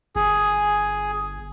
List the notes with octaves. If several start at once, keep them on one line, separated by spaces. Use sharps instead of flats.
G1 G#4